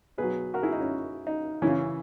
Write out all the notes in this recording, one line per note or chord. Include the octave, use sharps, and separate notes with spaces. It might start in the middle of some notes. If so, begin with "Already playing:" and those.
B2 F#3 G#4 B4
F#4 A#4
E4 G#4
D#4
C#4
D#4
C#3 E3 C#4 E4